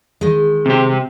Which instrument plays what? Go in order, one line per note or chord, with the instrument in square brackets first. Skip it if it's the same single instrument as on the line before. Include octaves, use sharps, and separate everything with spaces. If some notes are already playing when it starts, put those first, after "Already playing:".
[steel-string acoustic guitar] D#3 G#3
[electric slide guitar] C3 G4